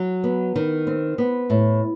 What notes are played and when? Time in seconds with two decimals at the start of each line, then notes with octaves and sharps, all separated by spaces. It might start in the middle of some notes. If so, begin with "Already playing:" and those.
Already playing: F#3
0.24 B3
0.56 D#3
0.87 C4
1.18 B3
1.50 A2